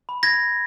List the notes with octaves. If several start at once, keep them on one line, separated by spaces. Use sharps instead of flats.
B5
G#6 A#6